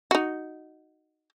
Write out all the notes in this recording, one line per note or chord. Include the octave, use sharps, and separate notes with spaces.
D#4 F#4